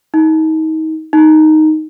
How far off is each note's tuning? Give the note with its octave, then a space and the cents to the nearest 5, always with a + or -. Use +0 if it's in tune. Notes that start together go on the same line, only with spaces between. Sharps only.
D#4 +30
D#4 +0